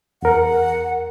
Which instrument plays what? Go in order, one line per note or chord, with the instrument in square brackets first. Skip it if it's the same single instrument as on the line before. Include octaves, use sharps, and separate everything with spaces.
[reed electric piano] E2 A#4 [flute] F#5